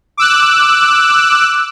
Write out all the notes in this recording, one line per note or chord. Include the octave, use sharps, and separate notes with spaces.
D6 E6 F#6